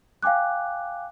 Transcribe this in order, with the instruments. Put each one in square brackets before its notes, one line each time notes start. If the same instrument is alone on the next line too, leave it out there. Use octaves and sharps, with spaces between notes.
[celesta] F5 G5 G#5 D6 F#6